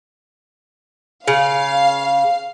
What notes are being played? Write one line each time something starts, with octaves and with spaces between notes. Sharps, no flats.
C#3 F5